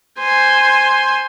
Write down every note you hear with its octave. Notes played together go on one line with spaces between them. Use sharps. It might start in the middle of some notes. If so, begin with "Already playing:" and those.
C5 G#5